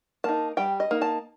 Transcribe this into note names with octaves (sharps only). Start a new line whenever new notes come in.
A#3 D#4 A5
G3 G5
D#5
A#3 D#4
A5